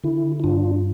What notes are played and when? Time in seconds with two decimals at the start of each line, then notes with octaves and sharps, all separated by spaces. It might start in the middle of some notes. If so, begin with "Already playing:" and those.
0.04 D3 E4
0.40 E4
0.44 G2 D4 F4